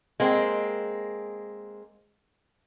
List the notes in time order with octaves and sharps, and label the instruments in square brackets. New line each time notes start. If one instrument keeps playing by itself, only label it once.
[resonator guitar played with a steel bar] G#3 A#3 C4